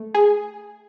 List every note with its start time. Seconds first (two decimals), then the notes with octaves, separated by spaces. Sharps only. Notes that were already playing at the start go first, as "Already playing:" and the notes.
Already playing: A3
0.14 G#4